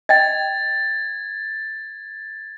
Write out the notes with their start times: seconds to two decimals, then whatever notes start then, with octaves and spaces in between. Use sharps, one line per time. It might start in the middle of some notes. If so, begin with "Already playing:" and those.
0.09 D#5 G5 G#6 A6